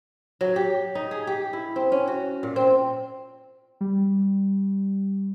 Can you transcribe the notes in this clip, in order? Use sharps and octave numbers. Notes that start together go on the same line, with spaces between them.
F#3
G4
D#4
G#4
G4
E4
C4
C#4
F#4
A#2
C4
G3